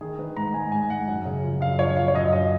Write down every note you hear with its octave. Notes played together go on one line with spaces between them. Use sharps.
D#3 G#4
D#3 B4
G#2 A#5
G#2 G#5
G#2 G#5
G#2 F#5
F#2
C#3
F3
F#2 F5
F3 C#5
F3 F5
C#5
F#2 D#5
F#2 D#5